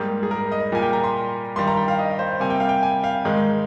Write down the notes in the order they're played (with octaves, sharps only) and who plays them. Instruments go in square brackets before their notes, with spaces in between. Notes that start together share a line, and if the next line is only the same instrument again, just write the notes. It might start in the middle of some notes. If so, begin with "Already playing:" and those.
Already playing: [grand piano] G#2 G3 A#3 G#4
G#4
A#4
D#5
A#2 G3 A#3 G#5
G5
A#5
C6
G2 D#3 G3 C6
A#5
G5
F5
D#5
C5
C3 G3 A#3 G#5
G5
F5
G5
G#5
F5
G#2 D#3 G#3